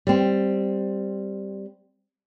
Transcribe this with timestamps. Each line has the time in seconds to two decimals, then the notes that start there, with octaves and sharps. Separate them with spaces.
0.07 G3 C4